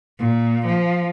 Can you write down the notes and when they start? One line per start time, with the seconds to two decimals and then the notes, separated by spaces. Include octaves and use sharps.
0.19 A#2
0.66 F3